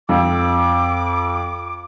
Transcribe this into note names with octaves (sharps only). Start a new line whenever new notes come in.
F2 D6